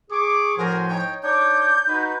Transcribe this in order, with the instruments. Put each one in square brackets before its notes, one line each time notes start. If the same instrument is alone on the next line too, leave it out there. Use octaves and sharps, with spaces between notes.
[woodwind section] G#4 [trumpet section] C#6 D6
[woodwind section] A2 F3 [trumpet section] F#4 G#5 C6 [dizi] A#4
[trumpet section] D#4 C#5 [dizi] G5
[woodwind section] D4 D#4 C#5 [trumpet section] D6 [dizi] G6
[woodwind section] D#4 [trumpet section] F#4 B4